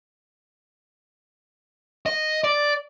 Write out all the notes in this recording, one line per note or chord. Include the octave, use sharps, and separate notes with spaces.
D#5
D5